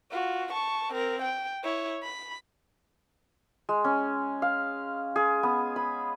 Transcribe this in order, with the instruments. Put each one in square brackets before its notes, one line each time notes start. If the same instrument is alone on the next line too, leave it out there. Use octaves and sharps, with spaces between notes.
[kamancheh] F4 F#4
A5 C#6
C4 A#4
G5
E4 C#5
B5
[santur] G#3
C#4
F5
G#4
B3
B5